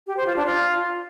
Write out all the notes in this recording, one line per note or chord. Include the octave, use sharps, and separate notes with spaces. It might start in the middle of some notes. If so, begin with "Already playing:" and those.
G4
C5
F4
D4
F4